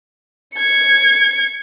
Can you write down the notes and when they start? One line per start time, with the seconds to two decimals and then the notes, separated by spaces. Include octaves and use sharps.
0.55 G#6 C#7